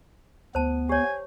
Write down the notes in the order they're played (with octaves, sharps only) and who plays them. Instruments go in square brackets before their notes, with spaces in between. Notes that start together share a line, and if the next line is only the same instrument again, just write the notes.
[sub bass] D2 [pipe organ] B3 [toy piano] C5 A5
[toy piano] G4 C#5 [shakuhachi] G#5